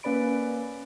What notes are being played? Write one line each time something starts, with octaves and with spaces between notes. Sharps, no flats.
A#3 C#4 B4 D5 B5 D7